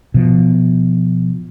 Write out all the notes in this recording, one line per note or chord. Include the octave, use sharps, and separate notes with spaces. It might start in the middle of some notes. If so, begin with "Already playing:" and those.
B2 F3